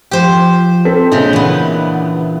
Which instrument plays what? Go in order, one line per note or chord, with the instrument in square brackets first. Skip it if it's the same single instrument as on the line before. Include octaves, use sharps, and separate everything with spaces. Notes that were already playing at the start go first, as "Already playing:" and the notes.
[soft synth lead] F3 [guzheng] G4 C5
[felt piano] C4 A4 B6
[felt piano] A#1 [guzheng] C#3 G#3 [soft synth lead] G6
[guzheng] A#2 B3 [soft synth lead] E3